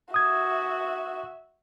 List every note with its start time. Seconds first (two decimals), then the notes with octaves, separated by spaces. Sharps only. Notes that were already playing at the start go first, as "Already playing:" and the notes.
0.14 F#4 E5 D#6 G#6